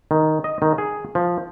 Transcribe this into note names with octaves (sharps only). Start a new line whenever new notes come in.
D#3
D#5
D#3
G#4
F3